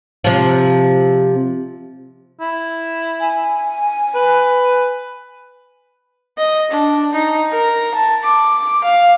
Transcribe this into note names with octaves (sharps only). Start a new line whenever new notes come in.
C3 F3
E4
G#5
B4
D#5
D4
D#4
A#4
A5
D6
F5